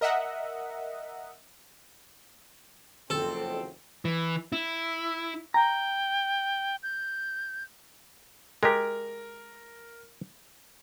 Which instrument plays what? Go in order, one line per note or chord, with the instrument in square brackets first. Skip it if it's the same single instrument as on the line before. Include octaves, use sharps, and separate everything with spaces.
[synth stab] A#4 D#5 E5 F#5
[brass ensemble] F#1 F2 C4 [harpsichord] A4
[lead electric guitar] E3
E4
[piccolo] G5 [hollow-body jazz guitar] A#5
[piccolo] G6
[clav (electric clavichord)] G#3 G4 [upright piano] A#4